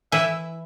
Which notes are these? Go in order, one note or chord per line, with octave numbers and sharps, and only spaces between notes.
E3 E4 E5